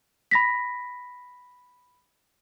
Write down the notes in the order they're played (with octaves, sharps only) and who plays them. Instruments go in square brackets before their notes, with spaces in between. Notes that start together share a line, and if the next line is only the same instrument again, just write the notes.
[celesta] B5 A#6 B6